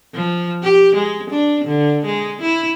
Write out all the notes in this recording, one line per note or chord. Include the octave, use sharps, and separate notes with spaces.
F3
G4
G#3
D4
D3
G#3
E4